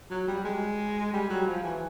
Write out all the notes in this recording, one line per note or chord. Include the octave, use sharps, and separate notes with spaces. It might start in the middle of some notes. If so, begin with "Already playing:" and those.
F#3
G3
G#3
G3
F#3
F3
E3